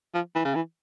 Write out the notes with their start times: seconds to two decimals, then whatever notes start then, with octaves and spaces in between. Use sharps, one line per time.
0.15 F3
0.35 E3
0.45 C#3
0.55 E3